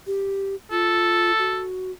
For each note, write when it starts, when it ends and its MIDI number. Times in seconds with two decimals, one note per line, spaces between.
0.07 0.55 67
0.71 1.32 65
0.71 1.66 69
1.39 1.91 66